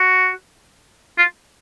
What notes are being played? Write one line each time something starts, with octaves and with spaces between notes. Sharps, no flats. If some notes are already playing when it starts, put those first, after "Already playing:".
Already playing: F#4
F4